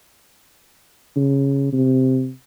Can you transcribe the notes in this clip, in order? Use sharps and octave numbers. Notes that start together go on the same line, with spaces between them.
C#3
C3